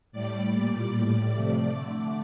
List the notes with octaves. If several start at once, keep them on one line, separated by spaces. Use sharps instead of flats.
A2 G3 D5
A#2 G3
A2 G3 D5
C3 F3 A3
D3 A3 D5